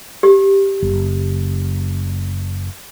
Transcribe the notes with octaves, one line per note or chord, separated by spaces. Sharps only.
G4
F#1